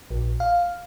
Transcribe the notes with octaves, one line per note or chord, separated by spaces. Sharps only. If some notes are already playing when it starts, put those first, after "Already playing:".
A#1
F5